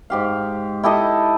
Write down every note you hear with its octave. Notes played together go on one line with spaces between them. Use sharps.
G#2 G4 F5
E4 G4 A4 D#5